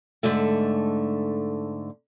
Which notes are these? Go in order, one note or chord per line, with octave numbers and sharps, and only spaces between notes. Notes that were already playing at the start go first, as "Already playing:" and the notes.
G#2 D3 A3